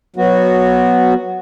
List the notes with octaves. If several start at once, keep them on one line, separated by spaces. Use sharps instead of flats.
F#3 B3 F#4